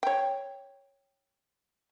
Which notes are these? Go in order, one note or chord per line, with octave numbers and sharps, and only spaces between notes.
C#5 G5